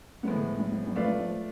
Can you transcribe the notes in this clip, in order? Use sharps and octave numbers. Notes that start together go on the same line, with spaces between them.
A2 F3 G#3 B3
D3
F3
F#3
F3
F#3
F3 A3 F4 B4 D5 F5
F#3
F3